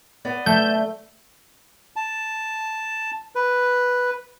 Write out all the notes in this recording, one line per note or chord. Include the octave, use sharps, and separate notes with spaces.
B3 D5 D#5
A3 E5 A5 G6
A5
B4